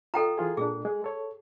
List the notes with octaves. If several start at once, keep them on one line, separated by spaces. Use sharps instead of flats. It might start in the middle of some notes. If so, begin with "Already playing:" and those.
F4 A4 D#5 G5 A#5
E3 F4 G#4
A#2 G#3 D4 G#4
G#3
A4 C#5